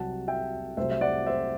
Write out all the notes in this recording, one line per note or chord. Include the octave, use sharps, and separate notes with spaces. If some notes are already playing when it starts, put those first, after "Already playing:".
Already playing: C2 C3 F#3 F#5 A5
E5 G5
C2 C3 F#3 A3 C5 E5
E5
D5 F#5
C5 E5